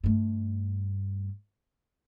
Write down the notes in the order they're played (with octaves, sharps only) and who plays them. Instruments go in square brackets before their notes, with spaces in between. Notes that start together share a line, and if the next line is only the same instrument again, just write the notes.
[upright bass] G2 A3